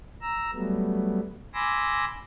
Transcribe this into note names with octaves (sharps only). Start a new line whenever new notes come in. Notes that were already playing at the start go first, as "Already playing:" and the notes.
A#5 E6
F#3 G3 A3 B3
G#5 B5 C6 D6 E6 A#6